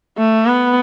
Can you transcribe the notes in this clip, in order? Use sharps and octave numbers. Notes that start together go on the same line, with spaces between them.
A3
B3